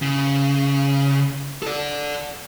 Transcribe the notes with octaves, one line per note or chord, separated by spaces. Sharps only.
C#3
A4 D5